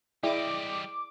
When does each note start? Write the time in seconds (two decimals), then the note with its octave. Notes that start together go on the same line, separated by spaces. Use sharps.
0.23 G3 E4 G#4 D5 D#5 G5 D6